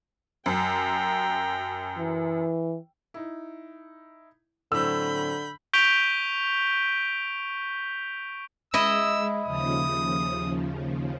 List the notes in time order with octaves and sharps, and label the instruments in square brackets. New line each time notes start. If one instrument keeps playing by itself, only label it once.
[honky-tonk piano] F#2 [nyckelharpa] G5 A#5
[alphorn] E3
[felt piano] D#4 E4
[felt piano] A2 F#3 C4 [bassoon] D3 [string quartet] B5 G6 [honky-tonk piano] E6
[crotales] C#6 G6 B6 D7 F7 G7
[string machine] G#3 [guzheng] E4 D#5 [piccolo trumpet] E6
[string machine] D#2 C#3 F3 [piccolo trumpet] D#6